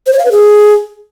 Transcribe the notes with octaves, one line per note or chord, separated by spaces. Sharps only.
C5
C#5
F5
B4
G#4